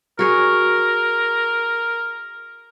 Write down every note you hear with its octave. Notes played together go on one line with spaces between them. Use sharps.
F#4 G#4 A#4 C#5